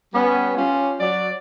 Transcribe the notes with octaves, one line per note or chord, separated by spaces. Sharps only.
G3 B3 C#4
C#4 F4 G4
F#3 D5